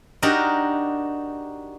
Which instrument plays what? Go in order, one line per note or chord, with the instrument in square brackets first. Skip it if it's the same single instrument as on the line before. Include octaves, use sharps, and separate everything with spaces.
[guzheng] D4 D#4 F#4 G4 A#4 D#5